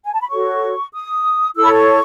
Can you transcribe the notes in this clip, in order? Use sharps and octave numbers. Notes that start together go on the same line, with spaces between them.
G#5
A5
B5
F#4 A4 C#5 C#6
D#6
E4 A4 C#5 E6
B5
C#6